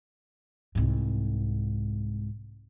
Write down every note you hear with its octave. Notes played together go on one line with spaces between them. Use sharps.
C2 G#2